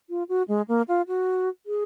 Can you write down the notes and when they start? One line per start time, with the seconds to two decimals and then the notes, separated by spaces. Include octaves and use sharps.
0.10 F4
0.29 F#4
0.48 G#3
0.68 A#3
0.88 F4
1.08 F#4
1.66 G#4